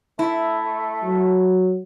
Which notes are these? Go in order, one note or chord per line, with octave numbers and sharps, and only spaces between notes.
A3 E4
F#3